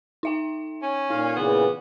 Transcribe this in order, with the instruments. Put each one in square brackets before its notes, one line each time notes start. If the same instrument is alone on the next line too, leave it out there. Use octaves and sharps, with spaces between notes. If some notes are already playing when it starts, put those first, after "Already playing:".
[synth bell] D#4 E5 G5
[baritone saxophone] C#4
[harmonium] A#2 F5 [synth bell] D#4
[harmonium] A#2 C#3 E3 [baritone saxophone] B3 [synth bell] F#5